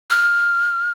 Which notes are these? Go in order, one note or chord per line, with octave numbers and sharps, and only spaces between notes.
F6